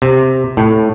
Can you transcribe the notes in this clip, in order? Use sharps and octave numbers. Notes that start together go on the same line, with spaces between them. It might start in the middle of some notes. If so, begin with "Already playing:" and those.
C3
A2